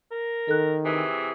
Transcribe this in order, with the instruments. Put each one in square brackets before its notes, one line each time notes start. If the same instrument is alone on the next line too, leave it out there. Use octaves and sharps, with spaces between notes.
[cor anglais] A#4
[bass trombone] D#3 [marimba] A4 F#6
[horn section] C3 E3 [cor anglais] G#4